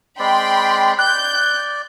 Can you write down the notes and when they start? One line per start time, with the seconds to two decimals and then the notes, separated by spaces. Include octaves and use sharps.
0.19 G#3 C4 D5 G5 B5 C6
0.99 D5 F#6 G6